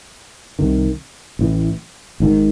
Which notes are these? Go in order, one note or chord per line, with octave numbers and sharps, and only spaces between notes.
C2 C3 D#3
A1 A2 E3
G#1 G#2 D#3